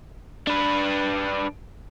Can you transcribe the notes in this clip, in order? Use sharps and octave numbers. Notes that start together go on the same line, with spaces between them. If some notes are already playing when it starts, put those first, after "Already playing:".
D4 B4